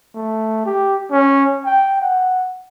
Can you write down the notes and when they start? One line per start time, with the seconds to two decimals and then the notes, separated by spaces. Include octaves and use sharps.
0.15 A3
0.66 G4
1.11 C#4
1.66 G5
2.01 F#5